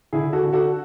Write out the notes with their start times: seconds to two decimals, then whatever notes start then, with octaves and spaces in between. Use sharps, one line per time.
0.13 D3 E4 G#4
0.33 F#4 A4
0.43 D3
0.53 F#4 A4